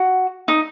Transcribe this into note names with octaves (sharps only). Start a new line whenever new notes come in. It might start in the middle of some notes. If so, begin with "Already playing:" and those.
Already playing: F#4
D#4